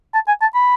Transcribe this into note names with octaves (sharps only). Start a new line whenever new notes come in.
A5
G#5
A5
B5